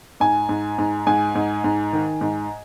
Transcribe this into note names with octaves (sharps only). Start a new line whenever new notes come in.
G#2 G#5
G#2
G#2
G#2 G#5
G#2
G#2
D#3
G#2